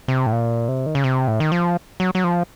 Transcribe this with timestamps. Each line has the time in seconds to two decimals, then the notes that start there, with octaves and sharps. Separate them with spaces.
0.08 C3
0.26 A2
0.32 A#2
0.68 C3
0.86 D#3
0.95 C#3
1.04 C3
1.28 A2
1.40 D#3
1.52 F3
2.00 F#3
2.15 F#3
2.24 F3